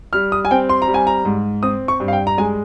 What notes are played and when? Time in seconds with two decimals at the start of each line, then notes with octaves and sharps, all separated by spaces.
0.13 G3 F6
0.32 D#6
0.45 G#5
0.51 C4 G5
0.69 C6
0.82 A#5
0.88 G3
0.94 G#5
1.07 A#5
1.25 G#2
1.63 C4 D#6
1.88 C#6
2.00 G2
2.08 F5
2.13 G5
2.27 A#5
2.38 G#3 G#5